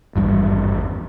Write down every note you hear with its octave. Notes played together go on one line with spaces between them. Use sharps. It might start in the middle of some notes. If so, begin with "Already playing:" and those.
G#1 E2 G2 G3